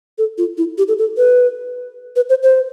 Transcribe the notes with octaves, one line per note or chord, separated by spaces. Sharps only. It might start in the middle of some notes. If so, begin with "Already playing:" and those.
A4
F4
E4
G4
A4
A4
B4
B4
C5
C5